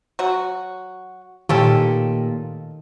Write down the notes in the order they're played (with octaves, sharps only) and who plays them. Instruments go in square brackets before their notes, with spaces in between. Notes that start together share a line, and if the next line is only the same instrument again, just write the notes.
[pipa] F#3 F#4
[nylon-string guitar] A#2 G4 [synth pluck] D#3 [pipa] A3 C#4 A4